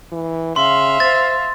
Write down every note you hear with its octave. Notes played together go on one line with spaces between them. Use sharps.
E3
C#3 E5 F5 C6
C5 A6